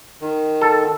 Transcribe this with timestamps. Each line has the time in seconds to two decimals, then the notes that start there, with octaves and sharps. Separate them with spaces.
0.22 D#3
0.61 A4